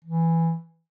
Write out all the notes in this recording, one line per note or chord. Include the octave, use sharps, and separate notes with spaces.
E3